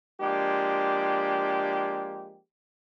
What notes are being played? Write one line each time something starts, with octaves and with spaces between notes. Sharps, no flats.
F3 G#3 A#3 D4 G4